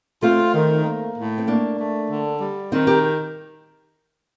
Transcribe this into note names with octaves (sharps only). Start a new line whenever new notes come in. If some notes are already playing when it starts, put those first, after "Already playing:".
A3 C4 F4
D#3
A#3
A2
C4
A3 A#3 D4
A3
D3
G3
D#3 C4 D#4
G4 A#4